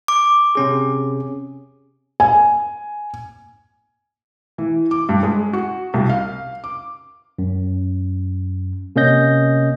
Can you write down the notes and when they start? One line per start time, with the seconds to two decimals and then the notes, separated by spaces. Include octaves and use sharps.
0.08 D6
0.55 C3 C#4 G#4
2.20 G#5
4.58 E3
4.91 D6
5.09 G2
5.23 G#3
5.53 F#4
5.94 C2
6.10 F5
6.64 D6
7.38 F#2
8.96 C3 A#3 C#4 D#5 G6 A#6